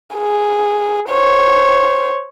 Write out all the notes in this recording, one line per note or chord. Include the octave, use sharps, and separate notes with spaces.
G#4
C5 C#5